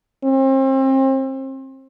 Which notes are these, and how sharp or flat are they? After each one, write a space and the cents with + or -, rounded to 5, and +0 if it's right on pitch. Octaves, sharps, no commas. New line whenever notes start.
C4 +35